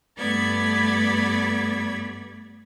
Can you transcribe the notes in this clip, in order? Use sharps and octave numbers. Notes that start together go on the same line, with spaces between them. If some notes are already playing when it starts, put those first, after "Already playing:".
G2 A3 B3 D5 B5 G#6